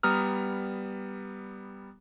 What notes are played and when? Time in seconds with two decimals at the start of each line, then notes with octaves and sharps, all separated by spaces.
0.03 G3 B3 A#5 D#6 F6